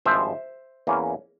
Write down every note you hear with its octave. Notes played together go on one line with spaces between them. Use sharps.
G#1 G2 F3 G#3 C5 E5
E2 E3 A#3 C#4